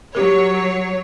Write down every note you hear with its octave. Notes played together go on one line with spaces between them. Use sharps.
F#3 G4 A#4 C#5